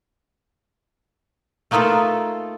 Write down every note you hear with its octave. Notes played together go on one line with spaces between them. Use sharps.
A3 A#3 D#4 F4 A4 B4